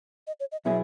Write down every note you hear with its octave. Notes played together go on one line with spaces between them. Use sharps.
D#5
C#5
D#5
B2 F#3 B3 E4 G#4 E5